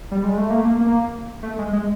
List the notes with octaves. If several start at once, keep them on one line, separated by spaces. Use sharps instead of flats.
G3
G#3
A3
A#3
A3
A#3
A#3
A3
G#3
G#3